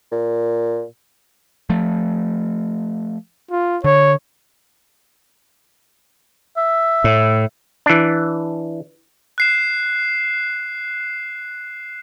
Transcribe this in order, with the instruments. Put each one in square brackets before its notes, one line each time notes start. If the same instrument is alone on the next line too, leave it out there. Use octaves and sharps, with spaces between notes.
[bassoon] A#2
[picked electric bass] F3 A3
[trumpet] F4
[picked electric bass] D3 [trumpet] C#5
[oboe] E5
[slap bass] A2
[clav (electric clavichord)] E3 D4
[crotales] F#6 C7 E7